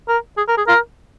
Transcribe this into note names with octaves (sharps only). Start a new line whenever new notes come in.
A#4
G#4
A#4
G#4
F4 A#4